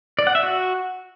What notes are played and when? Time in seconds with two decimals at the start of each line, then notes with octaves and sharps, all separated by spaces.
0.19 D5
0.27 F#5
0.35 E5
0.43 F#4